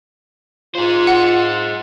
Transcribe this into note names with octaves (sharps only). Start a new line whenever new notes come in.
F4 G#4 C5
F#5